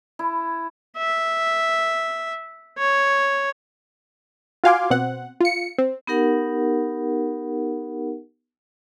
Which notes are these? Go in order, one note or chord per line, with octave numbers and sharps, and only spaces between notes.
E4
E5
C#5
F4 F#4 F5 G#5 C6 D6
B2 C4 F#5
F4 C#7
C4
B3 D#4 G4 A#4 F#5